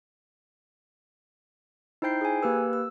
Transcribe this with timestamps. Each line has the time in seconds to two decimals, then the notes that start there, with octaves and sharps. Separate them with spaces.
2.02 D#4 E4 C5 G5 G6 C7
2.21 G#4 G#5
2.43 A#3 G4 B4 E6
2.73 E6